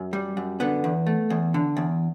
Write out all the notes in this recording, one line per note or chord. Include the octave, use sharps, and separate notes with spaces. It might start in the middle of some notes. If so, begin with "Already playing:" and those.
Already playing: F#2
G3
F#2
D3 B3
E2
A3
E2
D3
E2